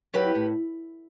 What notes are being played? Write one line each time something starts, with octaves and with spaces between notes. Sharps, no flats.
F#3 C4 E4 G4 B4
A2